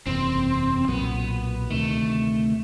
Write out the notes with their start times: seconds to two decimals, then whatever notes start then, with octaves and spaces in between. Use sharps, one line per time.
0.06 F#1 E2 C3 C4
0.88 B1 A#2 F#3 B3
1.70 D2 C3 D#3 A3